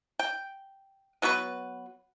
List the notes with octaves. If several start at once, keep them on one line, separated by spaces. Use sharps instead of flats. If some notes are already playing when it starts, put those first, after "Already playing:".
G5
F#3 B3 F#4 B4